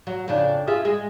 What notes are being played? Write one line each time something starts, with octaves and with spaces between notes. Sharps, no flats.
F#3
F2 C#3 D4
F4 G#4 E5
G#3 G#4